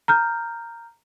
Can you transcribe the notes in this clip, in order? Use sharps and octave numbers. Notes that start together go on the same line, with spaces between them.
A#5 F6 G6